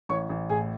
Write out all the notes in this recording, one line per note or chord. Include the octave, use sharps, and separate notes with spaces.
A1 C#5 C#6
A1
A2 G#4 G#5